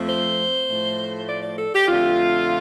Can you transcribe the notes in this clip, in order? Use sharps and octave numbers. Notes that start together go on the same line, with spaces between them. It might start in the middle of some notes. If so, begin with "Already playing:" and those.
Already playing: F2 F3 A3
C5
A2 F3 A3
D5
D5
A4
G4
F2 D3 A3 F4